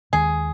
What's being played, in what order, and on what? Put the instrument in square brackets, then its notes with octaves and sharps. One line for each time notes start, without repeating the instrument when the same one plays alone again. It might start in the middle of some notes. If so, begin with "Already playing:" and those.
[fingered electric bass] D#2 D#3 G#3 [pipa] G#4